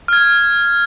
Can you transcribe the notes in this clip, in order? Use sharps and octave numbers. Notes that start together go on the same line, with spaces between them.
F6 G#6